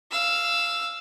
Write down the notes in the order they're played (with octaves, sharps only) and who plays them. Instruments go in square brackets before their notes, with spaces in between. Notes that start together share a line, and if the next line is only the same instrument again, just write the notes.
[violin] F5 E6